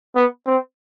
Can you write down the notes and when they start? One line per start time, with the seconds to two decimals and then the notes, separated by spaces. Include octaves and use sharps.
0.16 B3
0.47 C4